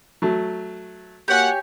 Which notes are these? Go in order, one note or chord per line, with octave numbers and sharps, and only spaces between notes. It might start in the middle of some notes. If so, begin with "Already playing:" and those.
F#3 A3
A#3 F#4 G4 C#5 F#5 G#5